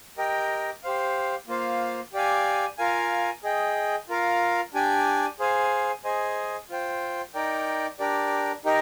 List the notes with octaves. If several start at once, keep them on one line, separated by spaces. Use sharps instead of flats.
G4 A#4 D#5 G5
G4 C5 F5
A#3 F4 C5 F5
G4 D5 F5 G#5
F4 A#4 F5 G#5
G#4 D#5 G5
F4 A#4 F5
D4 G4 D5 G#5
G#4 C5 F5 G#5
G#4 C5 D#5 G#5
F4 C5 G5
D#4 A#4 D5 G5
D4 G4 A#4 D5
D#4 G4 A#4 D#5